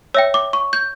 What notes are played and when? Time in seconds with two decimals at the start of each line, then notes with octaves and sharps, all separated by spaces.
0.14 C#5 E5 G5 E6
0.34 D6
0.53 C#6
0.73 G6